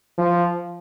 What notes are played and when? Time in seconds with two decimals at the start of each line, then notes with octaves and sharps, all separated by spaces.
0.18 F3